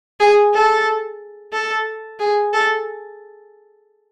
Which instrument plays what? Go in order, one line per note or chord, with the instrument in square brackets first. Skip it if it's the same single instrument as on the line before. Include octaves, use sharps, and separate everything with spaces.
[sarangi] G#4
A4
A4
G#4
A4